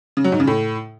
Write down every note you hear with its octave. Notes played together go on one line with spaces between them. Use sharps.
C#3
F#3
G#2
C#3
A2